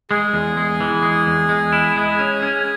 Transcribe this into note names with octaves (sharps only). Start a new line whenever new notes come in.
G#3 G#4
E2
G#3
E3
G#3
E2
G#3
E4
G#3
C#4
C#4